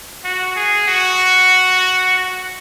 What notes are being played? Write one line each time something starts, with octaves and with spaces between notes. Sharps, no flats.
F#4
G#4
F#4